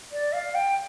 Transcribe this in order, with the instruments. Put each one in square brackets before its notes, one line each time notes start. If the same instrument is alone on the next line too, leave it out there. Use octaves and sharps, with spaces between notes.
[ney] D5
F5
G5